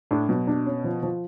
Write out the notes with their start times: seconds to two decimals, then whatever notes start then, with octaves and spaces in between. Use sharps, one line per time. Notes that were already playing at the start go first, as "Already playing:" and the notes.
0.11 A2 D4
0.29 B2 F#3
0.47 D4
0.66 C#4
0.84 F3
1.03 F3